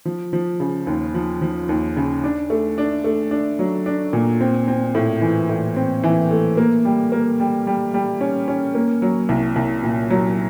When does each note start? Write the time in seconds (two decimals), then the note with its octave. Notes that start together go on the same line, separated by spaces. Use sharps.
0.05 F3
0.33 F3
0.60 C#3
0.87 D#2
1.14 F3
1.42 F3
1.69 D#2
1.97 C#3
2.24 D4
2.50 A3
2.78 D4
3.04 A3
3.31 D4
3.59 F#3
3.86 D4
4.13 A#2
4.41 C4
4.68 C4
4.95 A2
5.21 E3
5.49 A2
5.76 C4
6.04 E3
6.31 A3
6.57 A#3
6.85 G3
7.12 A#3
7.40 G3
7.67 G3
7.94 G3
8.21 C#4
8.48 C#4
8.74 A#3
9.02 F#3
9.29 C2
9.56 C2
9.83 A#2
10.10 F#3